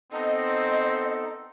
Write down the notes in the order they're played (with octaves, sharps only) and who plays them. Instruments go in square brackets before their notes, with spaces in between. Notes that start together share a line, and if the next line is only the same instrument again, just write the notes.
[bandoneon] B3 D#4 A4 [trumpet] C4 [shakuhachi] D#5